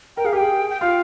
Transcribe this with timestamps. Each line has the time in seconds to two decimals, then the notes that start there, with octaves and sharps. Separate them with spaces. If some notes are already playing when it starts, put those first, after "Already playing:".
0.17 A#4 G5
0.25 G#4 F5
0.33 G4 G#5
0.38 G#4 G5
0.70 G5
0.81 F4 F5